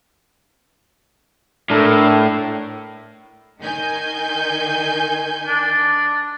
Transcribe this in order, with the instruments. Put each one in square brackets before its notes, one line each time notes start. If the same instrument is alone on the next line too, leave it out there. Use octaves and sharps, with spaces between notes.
[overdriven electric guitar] A2 [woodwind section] D4 A4 A#4
[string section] D#3 G#5 G6
[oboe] D4